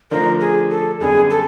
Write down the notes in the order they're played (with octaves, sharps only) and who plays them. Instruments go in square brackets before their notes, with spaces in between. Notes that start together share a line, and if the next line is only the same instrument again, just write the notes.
[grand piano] D3 F3 A3 D4 F4 [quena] A#4
[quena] G#4
A4
[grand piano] F#2 D3 G3 B3 D4 [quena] G#4
[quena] A4